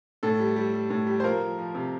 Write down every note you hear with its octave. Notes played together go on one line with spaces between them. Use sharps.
A2 A4
G3
G3
G3
A2
G3
C5
F3 A#3 A#4
F3
F3
C3